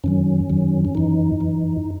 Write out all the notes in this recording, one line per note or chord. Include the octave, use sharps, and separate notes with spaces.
F#2 D#3 F#3 C#4
F#2 D#3 F#3
C#4
F#2 E3 D#4
F#2 E3